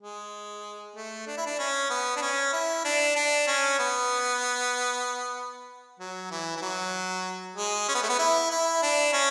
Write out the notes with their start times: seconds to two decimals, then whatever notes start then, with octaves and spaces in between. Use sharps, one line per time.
0.02 G#3
0.96 A3
1.27 D4
1.37 E4
1.46 D4
1.59 C#4
1.90 B3
2.16 D4
2.22 C#4
2.53 E4
2.84 D4
3.16 D4
3.47 C#4
3.79 B3
5.99 F#3
6.31 E3
6.56 E3
6.61 F#3
7.56 G#3
7.88 C#4
7.95 B3
8.02 A3
8.09 B3
8.19 E4
8.51 E4
8.82 D4
9.13 C#4